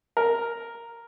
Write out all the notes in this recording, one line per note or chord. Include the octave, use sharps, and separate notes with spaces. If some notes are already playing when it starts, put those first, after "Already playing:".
A#4